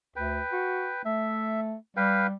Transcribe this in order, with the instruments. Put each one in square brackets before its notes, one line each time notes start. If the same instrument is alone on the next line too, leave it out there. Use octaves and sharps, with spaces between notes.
[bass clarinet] D2 [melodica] B4 G5
[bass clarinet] F#4
[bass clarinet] A3 [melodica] E5
[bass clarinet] G3 [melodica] B4 F5 G5